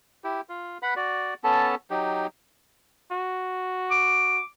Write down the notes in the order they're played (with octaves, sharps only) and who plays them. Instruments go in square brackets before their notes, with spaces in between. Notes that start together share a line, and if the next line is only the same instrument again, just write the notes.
[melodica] E4 G4
F4
B4 F#5 B5
F#4 D5
B3 C#4 A4 A5
F#3 D#4 G4
[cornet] F#4
[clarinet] D6